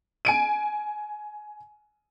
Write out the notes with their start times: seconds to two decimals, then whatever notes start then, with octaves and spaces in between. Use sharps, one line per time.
0.25 G#5 D7 D#7